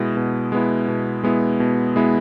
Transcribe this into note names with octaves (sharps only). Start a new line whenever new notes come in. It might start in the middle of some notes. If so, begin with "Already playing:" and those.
Already playing: B2 G#3 B3 E4
B2
G#3 B3 E4
B2
G#3 B3 E4
B2
G#3 B3 E4